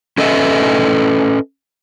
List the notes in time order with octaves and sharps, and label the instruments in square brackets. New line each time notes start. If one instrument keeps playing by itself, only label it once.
[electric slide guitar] C#4 A4 B4 D#5 E5